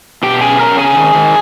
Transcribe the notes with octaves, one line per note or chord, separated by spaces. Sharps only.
B2 G4 G5
C#4 G#4 G#5
C#4 A#4 A#5
C#3 G#4 G#5
D#3
D#3